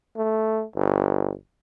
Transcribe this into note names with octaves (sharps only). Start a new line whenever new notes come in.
A3
G1